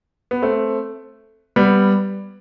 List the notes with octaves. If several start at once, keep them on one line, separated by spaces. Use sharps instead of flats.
B3
A3 C4
G3 B3